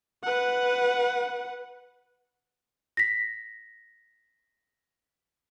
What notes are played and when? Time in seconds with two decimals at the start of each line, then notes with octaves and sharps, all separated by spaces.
0.24 B4 F#5
2.97 A#6 B6